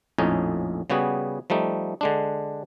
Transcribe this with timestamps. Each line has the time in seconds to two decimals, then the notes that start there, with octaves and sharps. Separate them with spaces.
0.18 A#1 F2 A2 C#4 D#4
0.90 C#3 G3 B3 F#4 G#4
1.50 F3 G3 A3 D#4
2.01 D3 G#3 D4